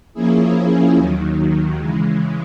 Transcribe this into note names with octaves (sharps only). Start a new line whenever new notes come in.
F3 A#3 C#4 E4 G#4
D#2 D#3 F#3
C#3 E3 G#3